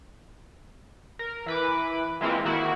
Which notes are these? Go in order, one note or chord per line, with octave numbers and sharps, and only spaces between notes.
A#4
E3 B4 D6
E3 G#3 A#3 C4 E4 F4
D#3 A#3 E4 F#4